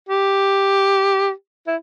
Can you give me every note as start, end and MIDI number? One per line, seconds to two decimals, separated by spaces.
0.09 1.31 67
1.67 1.76 64